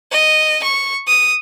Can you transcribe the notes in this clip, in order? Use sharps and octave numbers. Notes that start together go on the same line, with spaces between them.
D#5
C#6
D#6